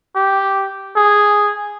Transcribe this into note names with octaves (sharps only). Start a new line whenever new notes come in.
G4
G#4